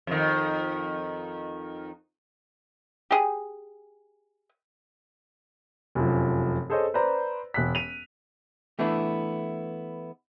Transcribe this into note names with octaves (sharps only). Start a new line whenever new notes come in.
F2 D#3
G4 G#4
F1 F#2 F3
G#4 A4 C5 C#5 D#5
B4 C5 D5 A#5
E1 F#6 B6
D#7 F7
E3 A3 B3 D4 E4